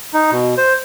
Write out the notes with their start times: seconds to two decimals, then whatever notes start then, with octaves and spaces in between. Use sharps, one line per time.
0.14 D#4
0.31 B2
0.57 C5